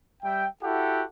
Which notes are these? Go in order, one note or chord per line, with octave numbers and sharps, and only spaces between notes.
G3 E5 G5
E4 F#4 G4 A4 F#5